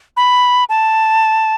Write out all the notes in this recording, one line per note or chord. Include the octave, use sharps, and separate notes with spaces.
B5
A5